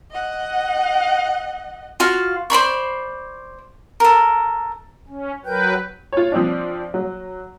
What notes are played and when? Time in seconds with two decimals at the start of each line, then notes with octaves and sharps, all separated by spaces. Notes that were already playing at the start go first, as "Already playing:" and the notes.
0.11 D#5 F#5
2.00 F4 F#4 F5
2.50 C5 D5 B5 C#6
4.00 A4 A#4
5.08 C#4
5.45 F#3 A#4 B4 G5 G6
6.13 F4 C#5
6.32 F3 C4 D4
6.94 F#3